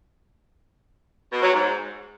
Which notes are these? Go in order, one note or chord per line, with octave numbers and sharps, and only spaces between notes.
B2
F#3
G#2